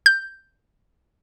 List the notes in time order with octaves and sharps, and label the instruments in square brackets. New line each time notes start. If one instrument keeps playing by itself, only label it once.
[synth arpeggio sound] G6